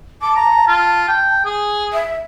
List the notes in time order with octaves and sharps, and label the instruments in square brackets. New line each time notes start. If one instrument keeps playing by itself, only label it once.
[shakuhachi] A5 [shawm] D6
[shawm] A#5
F4
G5
G#4
[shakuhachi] E5